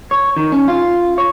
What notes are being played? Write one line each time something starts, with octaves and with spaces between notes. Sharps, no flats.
C#5
D#3
C#4
F4
C#5